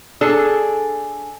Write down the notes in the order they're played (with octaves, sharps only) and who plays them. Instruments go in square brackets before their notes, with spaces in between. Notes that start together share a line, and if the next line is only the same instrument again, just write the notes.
[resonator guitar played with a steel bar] D4 G#4 A4